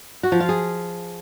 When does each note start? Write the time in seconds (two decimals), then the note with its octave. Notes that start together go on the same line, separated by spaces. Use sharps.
0.23 F#4
0.32 F3
0.40 F4
0.49 G#4